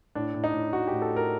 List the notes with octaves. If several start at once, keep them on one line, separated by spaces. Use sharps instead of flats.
A2 D4
A2
D#4
A2
A2 F#4
G4
A2
A4
A2 A#4